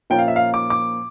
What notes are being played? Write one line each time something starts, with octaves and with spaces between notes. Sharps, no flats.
A#2 F3 A#3 C#4 F4 G5
F5
E5
F5
D6
D6